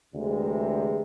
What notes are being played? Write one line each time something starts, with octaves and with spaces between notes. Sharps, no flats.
D2 C3 E3 G#3